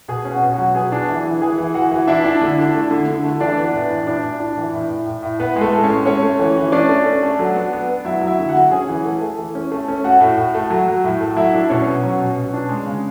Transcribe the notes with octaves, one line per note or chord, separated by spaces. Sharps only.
B2 G#4 G#5
C#4
F#4 F#5
B2
F#3 F#4 F#5
B3 G#4 G#5
D4
E3
E3
E3 G#4 G#5
E3
E3 F#4 F#5
E3
D4 E4 E5
D4
D3
D4
A3
D3
D3
A3
E3 D4 D5
B3
A2
E3
A2 D4 D5
A2
D4
E3
A2
A2
A2
A2
A2 B3 B4
G#3
A3 A4
A2
C#4 C#5
G#3
A3 C#4 C#5
A3
E3
E3
C#4 D4 D5
A3
C#4
A3
F#3
B3
B3
B3
F#3 E4 E5
F#3
E4 E5
D3
F#4 F#5
F#3
C#4 G#4 G#5
E3
A3
A3
E3
C#4
A3
C#4
A3 F#4 F#5
A2
A2
A3
F#3
F#3
A2
A3
F#3 E4 E5
D4
B2 C#4 C#5
B3
F#3
B2
B2
D4
G#3
C#3